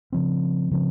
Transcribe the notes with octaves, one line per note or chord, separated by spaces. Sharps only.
C#3 F3 C4
C#3 F3 C4